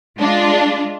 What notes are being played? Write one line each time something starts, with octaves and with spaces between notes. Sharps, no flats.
G#3 D4 F4